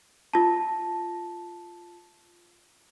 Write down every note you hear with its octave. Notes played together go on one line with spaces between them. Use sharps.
F4 A5